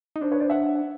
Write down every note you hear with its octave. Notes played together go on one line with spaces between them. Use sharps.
D#4
D4 C5
B4 C#5
C5 D5
E5 F#5